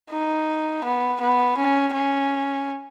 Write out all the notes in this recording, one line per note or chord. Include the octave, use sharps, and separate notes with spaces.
D#4
B3
B3
C#4
C#4